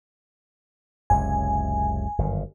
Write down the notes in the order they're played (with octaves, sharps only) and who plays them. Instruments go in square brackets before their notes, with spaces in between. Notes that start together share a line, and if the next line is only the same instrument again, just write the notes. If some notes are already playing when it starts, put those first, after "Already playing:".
[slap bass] F#1 C#2 C3 [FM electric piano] G#5
[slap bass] G1 F#2 D#3